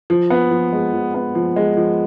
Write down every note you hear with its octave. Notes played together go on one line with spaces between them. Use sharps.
F3
B3
F3
G#3
F3
B3
F3
G#3
F3